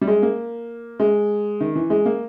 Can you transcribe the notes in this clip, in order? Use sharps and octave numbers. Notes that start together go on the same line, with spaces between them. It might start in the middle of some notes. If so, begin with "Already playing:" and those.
G3
G#3
A#3
G#3
D#3
E3
G#3
A#3